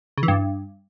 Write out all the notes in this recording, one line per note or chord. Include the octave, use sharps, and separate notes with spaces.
C#3
E3
G2